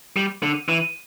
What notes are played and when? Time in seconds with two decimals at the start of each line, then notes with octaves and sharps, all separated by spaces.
0.16 G3
0.43 D3
0.69 E3